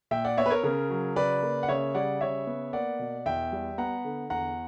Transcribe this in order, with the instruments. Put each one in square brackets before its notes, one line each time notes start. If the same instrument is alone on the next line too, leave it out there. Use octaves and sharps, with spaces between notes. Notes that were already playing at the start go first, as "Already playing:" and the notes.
[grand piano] A#2 E5 G5
D5 F#5
B3 C#5 E5
B4
A#4 C#5
C#3 A#4
F#3
C#3 B4 D5
A#3
F#5
C#3 C#5 E5
G3 D5 F#5
C#3 C#5 E5
B3
A#3 D5 F#5
B2
E2 E5 G5
G3
B3 F#5 A#5
D3
E2 F#5 A#5